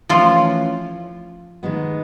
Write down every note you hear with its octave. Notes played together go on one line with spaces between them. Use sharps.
E3 F3 A3 C#4 F4
D#3 G#3 B3